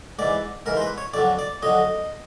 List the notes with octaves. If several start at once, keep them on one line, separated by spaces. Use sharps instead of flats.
G#2 E3 D5
G#2 E3 A#4
C5
B4
C#5
F2 D3 F#3 D5
D5
F2 D3 F#3 D#5